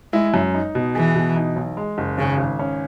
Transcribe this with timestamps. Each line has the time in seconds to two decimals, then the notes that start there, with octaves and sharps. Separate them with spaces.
0.13 G#3 E4
0.34 F#2
0.54 D#4
0.75 B2
0.95 E3 G#4
1.15 B2
1.36 D#4
1.56 B1
1.77 G#3
1.98 F#1
2.18 G#1 C#3
2.38 G#1
2.59 C#4